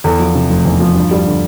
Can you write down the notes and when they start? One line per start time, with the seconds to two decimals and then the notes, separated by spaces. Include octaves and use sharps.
0.04 E2 A4
0.19 F3
0.35 C3
0.50 F1
0.65 E2
0.80 F3
0.96 G2
1.11 G3
1.26 D3